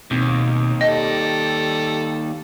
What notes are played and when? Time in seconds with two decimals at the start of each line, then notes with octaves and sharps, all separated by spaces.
0.11 D#2 B2 C4 D#4
0.81 G3 A4 D#5 G5